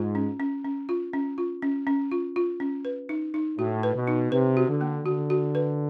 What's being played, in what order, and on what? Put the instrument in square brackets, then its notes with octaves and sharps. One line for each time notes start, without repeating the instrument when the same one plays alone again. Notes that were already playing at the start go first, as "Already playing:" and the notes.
Already playing: [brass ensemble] G#2 [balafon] F4
[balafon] C#4
C#4
C#4
F4
C#4
F4
C#4
C#4
F4
F4
C#4
B4
D#4
D#4
[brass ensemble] A2 [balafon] F#4
[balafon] B4
[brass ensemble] B2
[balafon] D#4
[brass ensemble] C3 [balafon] B4
[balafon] F#4
[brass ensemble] D3
[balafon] A#3
[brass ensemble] D3 [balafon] F#4
[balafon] F#4
B4